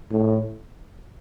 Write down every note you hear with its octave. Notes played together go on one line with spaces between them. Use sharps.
A2